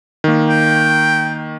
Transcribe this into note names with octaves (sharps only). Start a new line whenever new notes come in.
D#3 A#3
G5